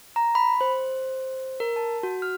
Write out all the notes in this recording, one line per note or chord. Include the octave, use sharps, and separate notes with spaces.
A#5
B5
C5
A#4
A5
F#4
F6